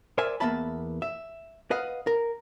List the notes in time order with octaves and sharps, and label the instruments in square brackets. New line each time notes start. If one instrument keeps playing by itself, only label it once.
[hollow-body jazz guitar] A#4 C5 D5 E5 G#5
E2 A#3 B3 E5 A5 B5
E5
B4 D#5 F5 F#5
A#4